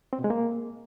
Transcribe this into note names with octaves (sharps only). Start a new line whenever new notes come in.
C4
B2
G#3
A#3